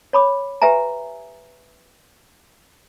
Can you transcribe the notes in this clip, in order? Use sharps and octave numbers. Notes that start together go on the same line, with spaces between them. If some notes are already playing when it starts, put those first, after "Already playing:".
C#5 B5 D6
G4 B4 E5 G#5 A#5